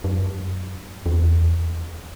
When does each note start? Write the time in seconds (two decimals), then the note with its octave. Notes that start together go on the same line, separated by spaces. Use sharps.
0.04 F#2
1.06 E2